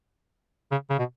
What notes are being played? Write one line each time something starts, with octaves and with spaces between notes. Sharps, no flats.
C#3
C#3
B2